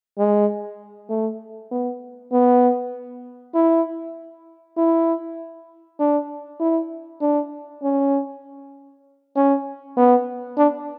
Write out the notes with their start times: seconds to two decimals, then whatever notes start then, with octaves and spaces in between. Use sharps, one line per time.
0.18 G#3
1.09 A3
1.71 B3
2.32 B3
3.54 E4
4.77 E4
6.00 D4
6.60 E4
7.21 D4
7.83 C#4
9.36 C#4
9.97 B3
10.58 D4